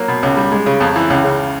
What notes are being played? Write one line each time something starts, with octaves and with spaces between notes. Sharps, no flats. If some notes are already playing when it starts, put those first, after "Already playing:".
Already playing: F#3 A#3
B2
C#2
G3
G#3
C#3
F2
E3
C#2
C#3